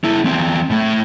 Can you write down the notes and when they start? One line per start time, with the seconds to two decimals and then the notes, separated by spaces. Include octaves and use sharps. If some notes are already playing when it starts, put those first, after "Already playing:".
0.04 A#3 E4
0.25 E2 C4
0.70 A2 A3